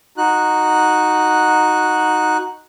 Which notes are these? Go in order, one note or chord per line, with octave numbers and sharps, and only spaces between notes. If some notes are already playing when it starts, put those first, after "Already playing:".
D#4 F#4 F#6